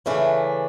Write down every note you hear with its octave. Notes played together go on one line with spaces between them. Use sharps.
C#3 E3 A3 D4